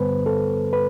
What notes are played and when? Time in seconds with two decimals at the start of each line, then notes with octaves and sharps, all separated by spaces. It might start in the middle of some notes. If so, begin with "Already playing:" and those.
Already playing: G2 D3 G3 B3 B4 C5
0.26 A4
0.73 B4